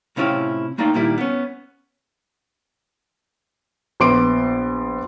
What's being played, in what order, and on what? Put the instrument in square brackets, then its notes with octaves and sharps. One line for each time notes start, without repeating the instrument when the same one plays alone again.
[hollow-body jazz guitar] A2 C3 C#4 E4 F4 G5
A3 A#3 D#4 F4 D5 G5
A#2 D#3 G3 A#3 E4
B3 C#4
[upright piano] A#1 B3 C6 D6 D7